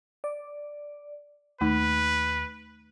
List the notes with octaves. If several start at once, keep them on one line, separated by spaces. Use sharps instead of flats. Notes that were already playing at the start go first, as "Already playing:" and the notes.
D5
D#2 A3 D#4 B4